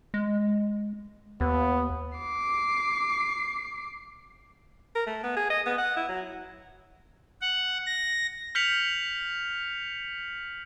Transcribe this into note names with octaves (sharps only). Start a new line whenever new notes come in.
G#3
D#2 B3
D6 C7
A#4
A3
B3
G#4
D#5
B3
F#5
E4
F#3
F#5
A#6
F6 G6 B6 C#7 F7 F#7